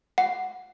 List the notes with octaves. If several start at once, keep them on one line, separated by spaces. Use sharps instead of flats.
F#5